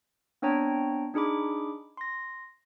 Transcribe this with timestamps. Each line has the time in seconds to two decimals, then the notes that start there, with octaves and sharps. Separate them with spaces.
0.42 B3 C4 D4 C#5 G5 A#5
1.14 D4 D#4 G#4 B5 D6
1.97 C6 A#6